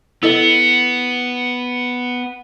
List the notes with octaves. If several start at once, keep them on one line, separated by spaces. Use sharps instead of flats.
B3 E4 A4 D#5